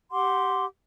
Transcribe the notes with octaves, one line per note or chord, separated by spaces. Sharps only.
G4 F#5 C6 D6